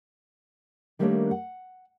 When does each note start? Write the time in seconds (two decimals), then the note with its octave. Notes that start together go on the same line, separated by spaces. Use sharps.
0.99 D#3 G3 A3 A#3 D4 C#5
1.31 F#5